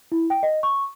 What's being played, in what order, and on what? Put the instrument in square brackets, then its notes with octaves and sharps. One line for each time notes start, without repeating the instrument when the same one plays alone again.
[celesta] E4
G5
D#5
C#6